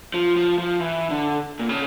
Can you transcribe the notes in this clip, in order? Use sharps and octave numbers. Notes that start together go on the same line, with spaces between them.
F3
F3
F3
E3
D3
A#2
C#3